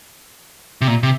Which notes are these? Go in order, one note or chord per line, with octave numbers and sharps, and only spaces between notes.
C3
A#2
C3